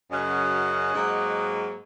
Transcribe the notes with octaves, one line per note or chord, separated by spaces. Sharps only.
F#2 C#3 F#3 C#4 D#5 F#5
G#2 F#3 A#3